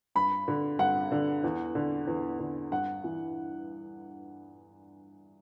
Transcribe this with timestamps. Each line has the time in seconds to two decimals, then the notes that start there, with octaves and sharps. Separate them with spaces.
0.15 G2 B5
0.48 D3
0.79 G2 F#5
1.12 D3
1.44 E2
1.75 D3
2.07 E2
2.39 D3
2.72 G2 F#5
3.04 E3